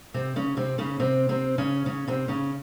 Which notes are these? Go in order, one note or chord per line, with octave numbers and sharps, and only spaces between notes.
C3 C4
C#3 C#4
C3 C4
C#3 C#4
C3 C4
C3 C4
C#3 C#4
C#3 C#4
C3 C4
C#3 C#4